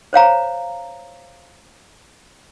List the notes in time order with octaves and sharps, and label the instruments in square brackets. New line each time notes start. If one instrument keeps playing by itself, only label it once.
[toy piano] C5 C#5 F5 A#5